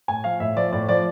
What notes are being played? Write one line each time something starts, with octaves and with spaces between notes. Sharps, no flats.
A2 G#5
F3 F5
A2 E5
F3 D5
A2 D5
F3 D5